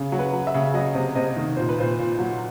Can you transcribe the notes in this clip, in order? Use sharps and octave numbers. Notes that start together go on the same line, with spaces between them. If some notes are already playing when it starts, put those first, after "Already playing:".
Already playing: C#3
F#3
B4
F#3
E5
C#3
F#3 D#5
C3
C3 D#5
D#3
A#2 C5
B4
A#2 C5
A#2
F#3